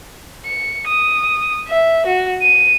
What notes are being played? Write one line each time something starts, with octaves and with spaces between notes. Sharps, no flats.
C#7
D#6
E5
F#4
D#7